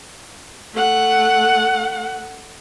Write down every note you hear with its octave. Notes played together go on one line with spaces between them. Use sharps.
A3 F#5